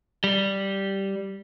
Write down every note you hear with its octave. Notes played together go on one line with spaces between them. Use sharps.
G3